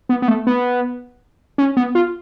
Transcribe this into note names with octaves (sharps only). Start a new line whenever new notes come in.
B3
B3
A3
B3
C#4
B3
F4